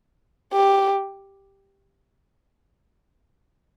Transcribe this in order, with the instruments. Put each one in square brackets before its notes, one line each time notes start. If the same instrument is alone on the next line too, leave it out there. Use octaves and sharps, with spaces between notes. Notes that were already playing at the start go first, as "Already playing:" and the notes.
[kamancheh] G4